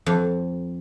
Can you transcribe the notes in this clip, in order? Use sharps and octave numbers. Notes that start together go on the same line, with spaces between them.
F2